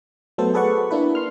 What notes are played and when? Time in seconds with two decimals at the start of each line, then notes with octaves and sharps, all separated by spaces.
0.38 F#3 A3 B3 A4 C5
0.54 G#4 A4 B4 D5 F#5 C#6
0.91 A#3 D4 E4 B4
1.15 C6 F6